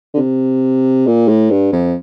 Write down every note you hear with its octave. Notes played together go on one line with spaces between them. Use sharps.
D3
C3
A#2
A2
G2
F2